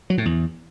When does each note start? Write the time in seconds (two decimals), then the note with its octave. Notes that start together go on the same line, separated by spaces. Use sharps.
0.10 F#3
0.18 A2
0.25 E2